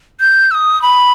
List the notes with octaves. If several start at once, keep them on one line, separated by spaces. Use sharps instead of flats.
G6
E6
D#6
B5